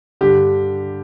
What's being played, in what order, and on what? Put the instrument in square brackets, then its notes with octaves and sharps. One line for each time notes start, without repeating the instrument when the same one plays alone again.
[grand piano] G2 D3 G4